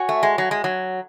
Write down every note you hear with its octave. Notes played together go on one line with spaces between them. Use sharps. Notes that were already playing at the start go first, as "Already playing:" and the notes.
Already playing: F#4 C#5 G#5 C#6
A3
G#3
F#3
G#3
F#3